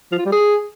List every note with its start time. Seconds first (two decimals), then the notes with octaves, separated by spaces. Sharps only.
0.12 F3
0.19 F4
0.25 G3
0.32 G#4